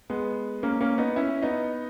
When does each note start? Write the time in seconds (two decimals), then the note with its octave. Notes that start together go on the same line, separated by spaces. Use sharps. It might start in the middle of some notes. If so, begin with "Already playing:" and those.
0.10 G#3 B3
0.63 A#3 C#4
0.81 A#3 C#4
0.98 B3 D#4
1.16 C#4 E4
1.42 B3 D#4